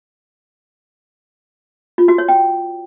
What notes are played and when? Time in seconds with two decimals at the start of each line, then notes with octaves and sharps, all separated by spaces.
1.98 F4
2.08 F#4
2.18 C#5
2.28 G5